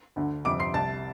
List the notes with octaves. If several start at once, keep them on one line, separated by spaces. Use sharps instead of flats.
D2 D3
G1 F2 C3 D6 D7
C6 C7
C2 C3 A5 A6